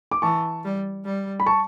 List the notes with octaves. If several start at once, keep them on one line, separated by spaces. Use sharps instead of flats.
D6
E3 A5 C#6
G3
G3
B5
A5 C#6